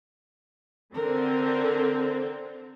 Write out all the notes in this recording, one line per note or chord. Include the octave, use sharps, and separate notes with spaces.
D3 C4 A#4